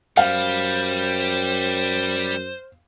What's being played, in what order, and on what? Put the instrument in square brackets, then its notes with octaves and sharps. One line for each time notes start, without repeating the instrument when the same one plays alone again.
[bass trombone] F#2 [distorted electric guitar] G3 [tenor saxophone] C5 [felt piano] F5